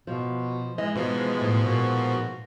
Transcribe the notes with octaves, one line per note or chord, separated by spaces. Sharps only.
B2 F3
E3 G#3 D#5
G#2 B2 E3 F3
A2
A#2 F#4